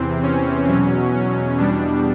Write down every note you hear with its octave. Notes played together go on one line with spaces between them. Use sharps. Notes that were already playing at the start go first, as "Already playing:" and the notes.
Already playing: E2 C3 E3 C4
C#4
E2 B2 F#3 C#4
C#4
E2 B2 G3 D4